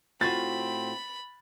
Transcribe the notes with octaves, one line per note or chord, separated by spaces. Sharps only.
A2 C4 F4 F#4 B5 A6